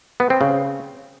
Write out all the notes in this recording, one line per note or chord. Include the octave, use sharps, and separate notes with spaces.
B3
C4
C#3